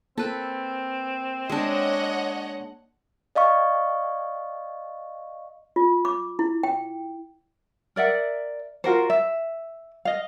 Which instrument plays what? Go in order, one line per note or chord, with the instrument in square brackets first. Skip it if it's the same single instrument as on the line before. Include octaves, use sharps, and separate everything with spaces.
[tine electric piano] A#3 [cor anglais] C4 [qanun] A4 B4
[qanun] G#3 D4 [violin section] C#5 D#5 F#5
[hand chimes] D5 D#5 F5 C#6
[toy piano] F4
D6
E4
G5
[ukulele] A#4 D5 E5 F#5
F4 F#4 A#4 C5
E5
D#5 F5